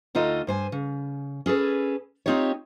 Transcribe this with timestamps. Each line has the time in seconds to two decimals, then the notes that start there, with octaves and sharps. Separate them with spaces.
0.15 D2 D#4 F4 A4 D#5
0.47 G2 C5 G#5
0.72 C#3
1.46 C#4 G#4 A4 B4
2.26 C4 C#4 D#4 F4 G4 C#5